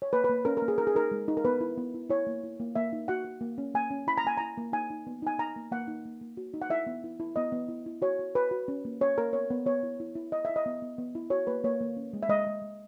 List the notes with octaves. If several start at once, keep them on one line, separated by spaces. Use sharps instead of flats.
C#5
A#3 B4
B4
A#3
C#4 A#4
A#4
A#3
G#4
D#4 A#4
G#4
D#4 A#4
G#3
D#4
A#4
B3 B4
E4
B3
E4
E4 C#5
A#3
E4
A#3
A#3 E5
D#4
F#4 F#5
F#4
A#3
C#4
A#3 G#5
C#4
E4 B5
A#5
A#3 G#5
E4 A#5
A#3
D#4 G#5
D#4
B3
D#4 G#5
D#4 A#5
A#3
A#3 F#5
D#4
A#3
A#3
F#4
D#4
F#5
E4 E5
B3
E4
E4
B3 D#5
B3
E4
E4
F#4 C#5
F#4
F#4 B4
F#4
C#4
A#3
C#4 C#5
A#3 A#4
B3 C#5
B3
B3 C#5
E4
E4
E4
E4 D#5
E4 E5
D#5
B3
B3
B3
E4
F#4 C#5
A#3 B4
A#3 C#5
A#3
C#4
G#3
E5
G#3 D#5
G#3
G#3